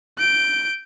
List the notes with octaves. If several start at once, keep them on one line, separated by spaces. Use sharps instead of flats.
G6 D7